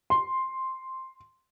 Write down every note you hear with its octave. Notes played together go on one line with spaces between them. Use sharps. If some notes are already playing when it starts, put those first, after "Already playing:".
C6